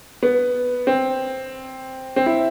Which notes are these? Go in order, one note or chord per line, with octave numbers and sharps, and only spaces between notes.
B3
C4
C4
E4